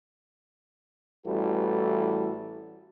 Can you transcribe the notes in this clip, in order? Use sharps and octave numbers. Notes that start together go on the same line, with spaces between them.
A1 E3 G3 F#4 A4